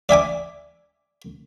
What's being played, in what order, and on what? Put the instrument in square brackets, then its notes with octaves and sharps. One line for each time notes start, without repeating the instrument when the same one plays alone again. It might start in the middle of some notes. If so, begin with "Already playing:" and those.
[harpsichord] D5 E5 G#5 D6